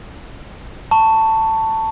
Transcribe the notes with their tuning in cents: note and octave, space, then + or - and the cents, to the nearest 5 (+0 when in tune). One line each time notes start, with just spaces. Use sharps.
A5 +15 C#6 +5